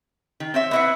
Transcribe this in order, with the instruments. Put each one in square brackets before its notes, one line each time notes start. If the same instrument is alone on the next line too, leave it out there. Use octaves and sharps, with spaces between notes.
[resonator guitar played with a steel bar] D#3
C4 C#5 E5
[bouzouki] B3 E4 F#5